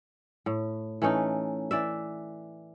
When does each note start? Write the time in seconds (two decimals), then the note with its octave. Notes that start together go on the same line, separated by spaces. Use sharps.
0.46 A2
1.02 E3 A3 C#4 D#4
1.71 E3 D5 E5